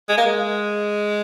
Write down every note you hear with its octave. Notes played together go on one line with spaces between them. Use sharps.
G#3
A#3
G#3